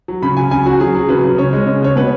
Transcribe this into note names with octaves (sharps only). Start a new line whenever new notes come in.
F#3
C#3 B5
F#3 G#5
C#3 G#5
F#3 F#4
F#3 G#4
F#3
C#3 B4
C#3
C#3 C#5
G#3
C#3
C#3 C#5
B2 B4